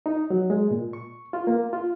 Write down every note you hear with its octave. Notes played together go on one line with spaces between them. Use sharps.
D#4
F#3
G#3
A#2
C#6
F4
A#3
F4